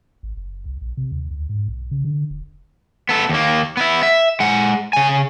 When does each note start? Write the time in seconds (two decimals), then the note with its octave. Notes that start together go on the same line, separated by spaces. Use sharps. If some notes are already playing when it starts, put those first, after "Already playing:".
0.23 G#1
0.37 F#1
0.66 C2
0.81 A#1
0.97 C3
1.12 D#2
1.31 D2
1.49 G#2
1.68 B1
1.91 C#3
2.05 D3
2.30 E1
3.09 B3 A4
3.29 D#2 A#3
3.77 B3 E4
4.03 E5
4.40 G#3 F#5
4.93 C#3 G#5